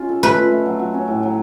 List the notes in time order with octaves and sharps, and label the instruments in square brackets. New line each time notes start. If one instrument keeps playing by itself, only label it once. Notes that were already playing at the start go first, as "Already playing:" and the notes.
Already playing: [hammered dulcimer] C#4 F4
A4
[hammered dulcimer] A3 [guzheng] B4
[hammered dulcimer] F4
A3
F#3
F#4
C#4
A2
F#3